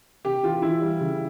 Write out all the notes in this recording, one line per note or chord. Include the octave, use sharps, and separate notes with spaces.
C3 G4
E3 F4
F4
E3 E4
G3
C#3